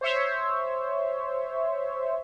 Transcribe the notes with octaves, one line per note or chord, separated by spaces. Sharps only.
C5 C#5 E5